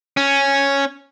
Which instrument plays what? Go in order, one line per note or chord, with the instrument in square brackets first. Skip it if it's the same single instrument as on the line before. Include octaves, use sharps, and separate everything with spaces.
[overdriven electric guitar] C#4